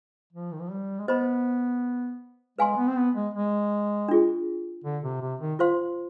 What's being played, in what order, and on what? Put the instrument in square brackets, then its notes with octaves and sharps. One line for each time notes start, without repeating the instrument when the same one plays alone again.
[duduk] F3
D#3
F3
G3
G#3
[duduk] B3 [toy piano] C5 D#5 B5
[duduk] G#3 [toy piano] B4 F5 G#5 C6
[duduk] B3
C4
B3
G#3
G#3
[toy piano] D4 F4 G#4
[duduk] D3
C3
C3
D#3
[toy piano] F4 C5 F5 C6